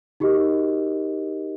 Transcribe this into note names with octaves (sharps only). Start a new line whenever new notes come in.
D#4 F#4 G4 A#4 D#5